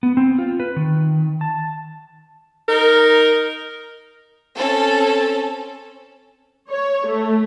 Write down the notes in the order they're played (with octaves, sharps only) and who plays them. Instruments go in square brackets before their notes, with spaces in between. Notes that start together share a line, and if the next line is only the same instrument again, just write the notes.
[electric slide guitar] B3
C4
F4
B4
D#3
A5
[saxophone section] D#4 A#4
[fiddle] C4 C#4 [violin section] A4
[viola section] C#5
A3